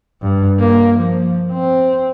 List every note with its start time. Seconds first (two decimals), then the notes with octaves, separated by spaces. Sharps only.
0.23 G2
0.60 A#3
0.98 F3
1.52 C4